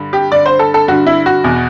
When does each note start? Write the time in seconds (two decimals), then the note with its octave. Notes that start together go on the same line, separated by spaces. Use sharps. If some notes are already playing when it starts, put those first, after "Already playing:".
Already playing: G2 D3
0.13 G4
0.32 G2 D3 D5
0.46 C5
0.59 A4
0.74 A4
0.88 G2 D3 F#4
1.06 E4
1.26 F#4
1.44 E2 B2